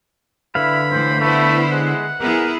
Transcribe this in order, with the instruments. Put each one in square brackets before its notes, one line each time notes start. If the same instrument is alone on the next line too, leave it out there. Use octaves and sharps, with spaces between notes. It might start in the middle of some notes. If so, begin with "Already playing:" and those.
[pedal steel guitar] D3 B4 F5 [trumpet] E4 [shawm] B5
[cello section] A2 E3 [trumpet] C5
[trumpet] A3 [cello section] B3 E4 C5
[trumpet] G#3 [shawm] F#5
[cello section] B3 E4 G#4 [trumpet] A#4